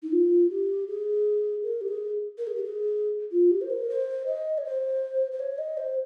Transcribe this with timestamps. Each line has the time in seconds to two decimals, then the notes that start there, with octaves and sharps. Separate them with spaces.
0.03 D#4
0.12 F4
0.50 G4
0.88 G#4
1.63 A#4
1.81 G4
1.88 G#4
2.38 A#4
2.47 G#4
2.55 G4
2.64 G#4
3.32 F4
3.51 G4
3.61 C5
3.70 A#4
3.89 C5
4.26 D#5
4.58 C#5
4.64 C5
5.32 C5
5.39 C#5
5.58 D#5
5.77 C5